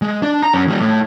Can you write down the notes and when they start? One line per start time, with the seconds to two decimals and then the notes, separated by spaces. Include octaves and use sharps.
0.02 G#3
0.22 D4
0.42 A#5
0.54 F#2 C#4
0.67 D#2 G3
0.82 A2